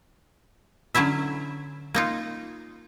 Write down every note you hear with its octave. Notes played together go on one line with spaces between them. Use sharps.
D3 F#3 C#4 E4 E5
A#3 D#4 F4